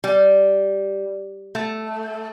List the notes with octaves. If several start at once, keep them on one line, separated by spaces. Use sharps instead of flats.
G3
A3